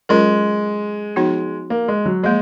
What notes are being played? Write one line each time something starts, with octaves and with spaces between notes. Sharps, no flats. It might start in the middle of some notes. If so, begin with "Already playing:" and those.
F#3 G#3 C#4 F4 A#4
F3 B3 D#4 F#4
A#3
G#3
F#3
F3 G#3 A#3